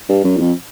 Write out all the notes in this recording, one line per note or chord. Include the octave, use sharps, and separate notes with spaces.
G2
F#2
E2
F2